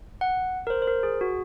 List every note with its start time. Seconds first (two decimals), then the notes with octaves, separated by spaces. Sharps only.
0.21 F#5
0.67 A#4
0.70 C5
0.82 C5
0.87 A#4
1.03 G#4
1.21 F#4